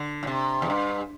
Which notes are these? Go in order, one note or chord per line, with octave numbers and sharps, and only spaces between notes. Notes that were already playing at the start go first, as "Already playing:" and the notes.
Already playing: D3
A2
C3
E2
G2